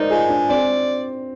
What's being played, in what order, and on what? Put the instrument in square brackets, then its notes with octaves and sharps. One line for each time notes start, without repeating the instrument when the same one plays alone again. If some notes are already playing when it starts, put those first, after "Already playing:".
Already playing: [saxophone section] D#4 [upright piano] A#4 C5 D5 D#5
[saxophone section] G#3 [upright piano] F4 G#4
[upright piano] D4
[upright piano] C4 [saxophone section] D5